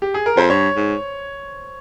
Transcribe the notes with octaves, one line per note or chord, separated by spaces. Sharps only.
G4
G#4
A#4
F2 C5
G2 C#5
G#2